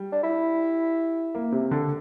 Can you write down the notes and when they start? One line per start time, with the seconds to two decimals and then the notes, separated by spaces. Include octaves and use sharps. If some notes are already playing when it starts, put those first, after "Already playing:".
Already playing: G3
0.12 D4
0.23 E4
1.35 A#3
1.52 C3
1.71 D3